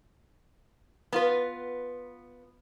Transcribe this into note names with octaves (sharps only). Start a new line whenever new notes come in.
B3 F4 B4